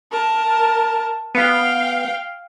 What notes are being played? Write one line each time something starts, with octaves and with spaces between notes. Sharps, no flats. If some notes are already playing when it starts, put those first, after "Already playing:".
A#4 A5
B3 F5 G5